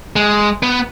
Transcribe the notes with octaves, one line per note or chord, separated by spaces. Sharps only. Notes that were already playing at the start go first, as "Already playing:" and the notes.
G#3
B3